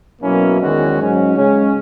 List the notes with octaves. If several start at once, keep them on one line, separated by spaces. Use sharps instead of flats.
B2 F#3 A#3 C#4 E4
E2 D#3 G#3 C#4 F#4
G#2 F#3 C#4
C#3 G#3 C#4